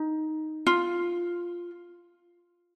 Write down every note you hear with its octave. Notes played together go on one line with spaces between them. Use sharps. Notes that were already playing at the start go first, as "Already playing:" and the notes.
Already playing: D#4
F4